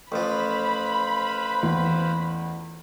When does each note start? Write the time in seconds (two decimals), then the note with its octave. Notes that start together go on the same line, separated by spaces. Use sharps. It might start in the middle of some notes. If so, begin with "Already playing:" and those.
0.12 A1 F3 B4 C5 F5 B5
1.63 E2